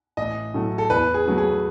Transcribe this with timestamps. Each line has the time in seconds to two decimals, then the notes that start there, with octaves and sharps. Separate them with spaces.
0.17 A1 D#5
0.54 A2 F#3 A3
0.78 A4
0.90 E2 B4
1.14 G#4
1.26 C#3 F#3 A3
1.38 G#4